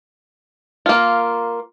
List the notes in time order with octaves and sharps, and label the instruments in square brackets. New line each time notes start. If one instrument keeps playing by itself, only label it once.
[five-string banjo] A#3 F4